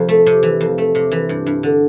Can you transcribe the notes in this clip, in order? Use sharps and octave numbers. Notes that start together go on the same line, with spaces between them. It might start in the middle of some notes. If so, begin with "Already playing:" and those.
Already playing: F2 C3 F3
A3
C3
E3
F2
A3
C3
E3
G2
G2
D3